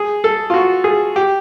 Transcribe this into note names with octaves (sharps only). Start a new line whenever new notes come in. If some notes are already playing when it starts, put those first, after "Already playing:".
Already playing: G#4
A4
F4
F#4
G#4
G4